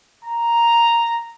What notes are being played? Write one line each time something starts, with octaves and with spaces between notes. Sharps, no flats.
A#5